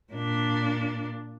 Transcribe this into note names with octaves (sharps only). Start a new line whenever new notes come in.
A#2 D4